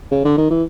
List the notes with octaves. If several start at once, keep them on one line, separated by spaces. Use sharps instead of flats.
C#3
D3
D#3
E3